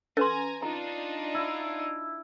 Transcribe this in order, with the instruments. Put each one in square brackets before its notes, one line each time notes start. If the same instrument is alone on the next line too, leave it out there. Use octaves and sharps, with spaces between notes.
[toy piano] C#4 B4 C6 [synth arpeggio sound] A4 [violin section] G#5 A#5
[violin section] D4 D#4 F4 [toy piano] A#5
[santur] E4